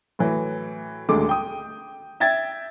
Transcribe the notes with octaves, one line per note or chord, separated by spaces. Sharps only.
A2 E3 F#3
D#1 D2 D3 G#3 A4 D6
G5 D#6
E5 G5 G#6 A6